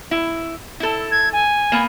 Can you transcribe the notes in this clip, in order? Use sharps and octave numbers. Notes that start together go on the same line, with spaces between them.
E4
E4 A4
G#6
G#5
A#3 B3